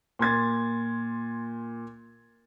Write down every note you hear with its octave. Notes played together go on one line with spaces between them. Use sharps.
A#2 C6 G#6 A6